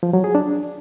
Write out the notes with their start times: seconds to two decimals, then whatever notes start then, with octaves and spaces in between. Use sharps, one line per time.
0.03 F3
0.13 F#3
0.24 G#4
0.35 D4